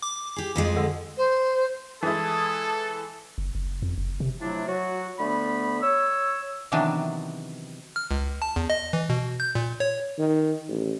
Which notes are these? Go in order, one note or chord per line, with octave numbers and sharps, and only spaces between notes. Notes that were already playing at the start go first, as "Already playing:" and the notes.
D6
G4 G#4
F2 F3 G#3
D3
C5
E3 G#3 E4 A4 A5 D#6 G#6
F#1
F#1
F2
F#1
C3
C3 F3 F#3 A3 D4 E4
F#3 F#4
D2 D3 A3 B3 B5
C#5 E6
C3 D#3 E3 F#3 B3 D4
F6
C#2
A5
E2
D#5
E3
B2
G6
A#2
C#5
D#3
A1